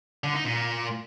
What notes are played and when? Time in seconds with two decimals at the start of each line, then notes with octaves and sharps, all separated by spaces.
0.24 D3
0.34 D#4
0.45 A#2